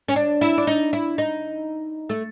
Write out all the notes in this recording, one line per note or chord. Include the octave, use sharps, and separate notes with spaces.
C#4
D4
E4
D4
D#4
E4
D#4
A3